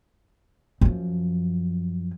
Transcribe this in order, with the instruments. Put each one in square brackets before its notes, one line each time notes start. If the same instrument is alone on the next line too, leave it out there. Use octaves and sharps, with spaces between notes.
[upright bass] F#2 F3